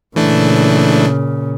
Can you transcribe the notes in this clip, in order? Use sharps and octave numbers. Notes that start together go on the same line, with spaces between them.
A#2 C#3 E3 A3 D4